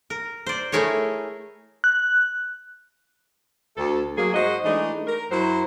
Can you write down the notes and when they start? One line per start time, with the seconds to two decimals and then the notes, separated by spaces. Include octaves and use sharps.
0.10 A#4
0.46 C5 D5
0.72 A3 E4 G#4 A#4 C#5
1.84 F#6
3.77 D2 A4
4.18 F#3 A#3 G#4
4.34 G#2 F#4 C5 D#5
4.64 E3 G#3 A3 D4 D#4 D#5
5.07 A#4
5.31 F#2 F#3 E4 C5